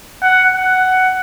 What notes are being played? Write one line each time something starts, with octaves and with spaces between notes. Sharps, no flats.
F#5
F#5